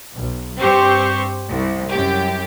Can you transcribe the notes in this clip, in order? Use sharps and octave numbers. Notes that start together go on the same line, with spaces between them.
B1
G2 C4 G4 C5 C#6
C2
F#2 G4